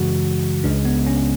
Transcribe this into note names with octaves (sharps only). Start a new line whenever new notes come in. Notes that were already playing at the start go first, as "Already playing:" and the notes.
Already playing: F#2 C#3 E3 G#3 F#4
C#2 C#3 G#3 D4
B3
C#4